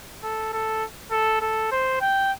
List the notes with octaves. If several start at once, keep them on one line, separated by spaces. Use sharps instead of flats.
A4
A4
A4
A4
C5
G5